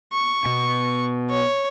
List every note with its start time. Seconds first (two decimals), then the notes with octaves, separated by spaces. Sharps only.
0.13 C#6
0.45 B2
1.30 C#5